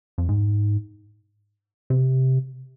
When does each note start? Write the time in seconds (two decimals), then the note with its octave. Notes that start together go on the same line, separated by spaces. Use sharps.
0.18 F2
0.29 G#2
1.90 C3